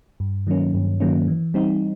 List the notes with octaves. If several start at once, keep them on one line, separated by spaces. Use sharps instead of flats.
G2
D#3 F#3 A#3 C#4
G2
D#3 F#3 A#3 C#4
E3
G3 C4 D#4